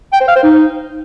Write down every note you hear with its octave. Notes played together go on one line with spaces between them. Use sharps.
G5
C5
F5
C5
D#4